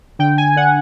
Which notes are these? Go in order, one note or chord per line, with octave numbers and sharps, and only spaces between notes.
D3 G5
G#5
D3 F#5